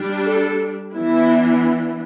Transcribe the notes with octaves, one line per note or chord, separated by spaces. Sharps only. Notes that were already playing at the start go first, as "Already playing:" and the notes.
Already playing: G3 D4
A4
E3 B3 D4 E4